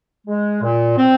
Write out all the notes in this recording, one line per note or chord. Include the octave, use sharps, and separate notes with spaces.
G#3
A#2
C4